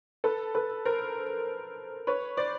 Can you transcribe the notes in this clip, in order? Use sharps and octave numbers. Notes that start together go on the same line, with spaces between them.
A4 B4
A4 B4
A#4 C5
B4 C#5
C5 D5